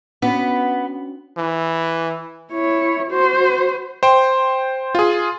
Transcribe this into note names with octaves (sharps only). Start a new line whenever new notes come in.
B3 C#4 D4 F#4
E3
E4 C#5
F#4 C5
C5 G5
F4 G#4